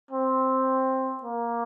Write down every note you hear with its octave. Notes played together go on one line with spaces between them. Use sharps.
C4
A#3